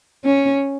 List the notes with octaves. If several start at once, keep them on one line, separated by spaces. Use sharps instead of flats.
C#4